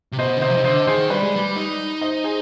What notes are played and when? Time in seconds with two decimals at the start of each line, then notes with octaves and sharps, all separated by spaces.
0.12 C3
0.19 B2 C5 D#5
0.37 D3
0.42 C3 C5 D#5
0.50 F3
0.57 D#3
0.64 D3 C5 D#5
0.87 D#3 G#4 C5
1.10 G3 B4 D5
1.23 G#3
1.36 G3
1.56 D#4
2.02 C5 D#5
2.24 G#4 C5